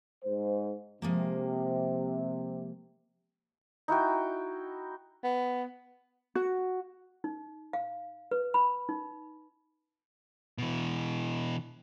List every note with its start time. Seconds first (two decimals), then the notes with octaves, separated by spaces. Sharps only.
0.24 G#2 C5
1.02 C3 F3 G#3 A#3
3.88 D#4 E4 F#4 G5
5.24 B3
6.35 F#4
7.24 D#4
7.73 F5
8.31 B4
8.54 B5
8.89 D#4
10.58 B2 E3